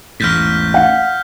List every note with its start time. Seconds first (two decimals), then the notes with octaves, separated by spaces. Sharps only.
0.20 A1 E2 G#2 F6 G6 B6
0.74 F5 F#5